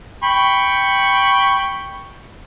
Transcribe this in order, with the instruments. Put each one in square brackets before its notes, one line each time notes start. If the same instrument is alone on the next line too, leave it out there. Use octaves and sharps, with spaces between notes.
[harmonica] G5 B5 C#6